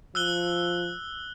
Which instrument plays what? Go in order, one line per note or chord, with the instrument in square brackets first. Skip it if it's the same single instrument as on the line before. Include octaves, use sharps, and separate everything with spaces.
[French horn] F3 [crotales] E6 F#6 G7